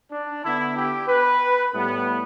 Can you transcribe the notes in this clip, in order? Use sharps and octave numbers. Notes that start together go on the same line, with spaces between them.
D4
D3 B3 E4
G4
B4
A2 G3 B3